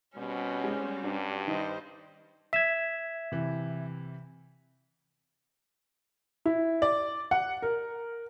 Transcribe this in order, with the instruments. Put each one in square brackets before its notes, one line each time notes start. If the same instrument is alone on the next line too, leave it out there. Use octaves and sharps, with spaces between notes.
[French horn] B2 [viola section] G3 C4 F#4 [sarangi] C#4
[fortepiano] G#3
[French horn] G2 [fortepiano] D4
[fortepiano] D#3 [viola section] G3 C5 [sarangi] D#5
[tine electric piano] E5 G#6 [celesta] B6 E7
[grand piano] C3 E3
[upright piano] E4
D5
F#5
A#4